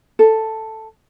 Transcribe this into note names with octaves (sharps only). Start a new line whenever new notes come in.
A4